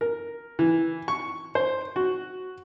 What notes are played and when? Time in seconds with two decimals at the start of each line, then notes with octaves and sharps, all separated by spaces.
0.01 A#4
0.59 E3
1.08 C#6
1.55 C5
1.96 F#4